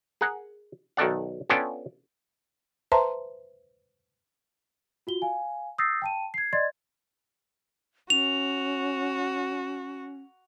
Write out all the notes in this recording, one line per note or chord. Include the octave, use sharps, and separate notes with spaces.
G#4 A#4 F#5
B1 D#3 A4 D5 F#5
B3 C#4 D4 F4 A4 G5
B4 C5 E5 A5 A#5 C6
F4 F#4 G7
F5 G#5
D#6 E6 G6 A6 A#6 C7
G5 A5 D#7
G#6 C7
D5 D#5 C6 G#6 A6
C#4 F#4 F7